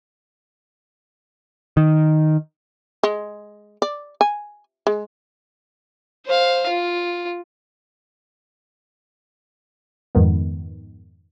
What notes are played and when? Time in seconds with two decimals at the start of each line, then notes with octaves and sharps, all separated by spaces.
1.77 D#3
3.03 G#3
3.82 D5
4.21 G#5
4.87 G#3
6.26 C5 F5
6.69 F4
10.15 F2 G#2 D#3 B3